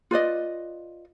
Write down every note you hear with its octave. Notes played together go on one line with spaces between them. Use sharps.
F4 B4 D5 D#5